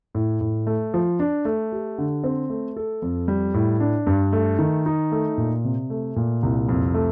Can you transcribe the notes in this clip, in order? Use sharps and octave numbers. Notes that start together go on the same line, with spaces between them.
A2
A2
A3
F3
D4
A3
G4
D3
C4
A3
A4
F2
G3
A2
D4
G2
A3
D#3
D#4
A3
A#2
C3
A3
A#2
C2
F2
A3